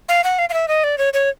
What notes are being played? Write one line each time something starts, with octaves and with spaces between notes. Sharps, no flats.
F5
F#5
F5
F5
E5
D#5
D5
C#5
C#5